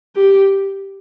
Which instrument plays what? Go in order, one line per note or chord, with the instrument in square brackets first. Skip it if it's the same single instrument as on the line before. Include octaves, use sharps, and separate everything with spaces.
[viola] G4